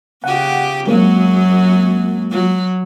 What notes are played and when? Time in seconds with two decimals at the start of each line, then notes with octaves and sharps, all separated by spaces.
0.24 C#3 G4 F#5
0.87 F#2 F#3 G#3 A#3 C4
2.31 F#3